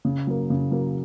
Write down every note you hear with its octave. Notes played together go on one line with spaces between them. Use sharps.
C#3
F#3 A#3
C#3
F#3 A#3